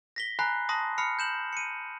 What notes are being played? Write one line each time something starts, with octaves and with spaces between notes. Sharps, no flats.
A#6 B6 G7
G#5 A#5 B5 F#6 C7
A5 C6 D#6 A#6
B5 F6 C7 C#7
G6 E7 F#7
C#7 D#7